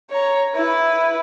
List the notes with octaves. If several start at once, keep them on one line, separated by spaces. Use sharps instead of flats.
C#5 A#5
E4 B4